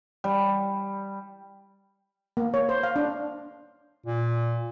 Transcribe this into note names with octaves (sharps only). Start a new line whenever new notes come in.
G3
A#3
C#5
C5
F5
D4
A#2